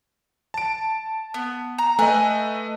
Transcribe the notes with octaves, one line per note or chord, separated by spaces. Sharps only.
A5 D7
B3
A#5
A3 B4 D#5 G#5 F#6